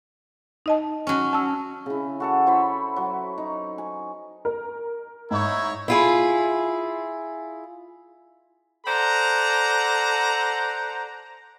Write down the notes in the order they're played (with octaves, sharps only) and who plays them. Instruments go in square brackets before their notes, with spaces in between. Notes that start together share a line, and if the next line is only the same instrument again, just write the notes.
[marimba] D#4 D#5 A5
[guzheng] F#3 C#4
[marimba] A5 E6
[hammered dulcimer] C#3 E4
F#4 A4 F#5
E4 C5 C#5 B5
F#3
D#4
G#5
[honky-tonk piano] A#4
[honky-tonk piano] G#2 [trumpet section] D#4 E4 C#5
[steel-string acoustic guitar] E4 F4 G#4
[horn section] A4 C5 D5 F#5 A#5